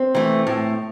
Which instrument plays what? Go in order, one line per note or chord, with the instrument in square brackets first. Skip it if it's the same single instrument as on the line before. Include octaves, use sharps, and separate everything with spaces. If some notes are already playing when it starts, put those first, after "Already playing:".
Already playing: [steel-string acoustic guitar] C4
E3 A3
A2